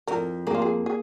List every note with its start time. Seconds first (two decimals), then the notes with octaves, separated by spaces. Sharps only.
0.07 F2 A#4
0.47 A#3 G#4
0.55 F4
0.62 G#4
0.86 G#4